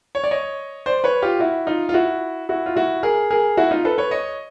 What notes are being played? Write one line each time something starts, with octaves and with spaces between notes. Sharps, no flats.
C#5
D5
C#5 D#5
C5 D5
B4 C#5
F4 G4
E4 F#4
D#4 F4
F4
E4 F#4
E4 F#4
F4
E4 F#4
G#4 A#4
G#4 A#4
E4 F#4
D#4 F4
A4 B4
B4 C#5
C#5 D#5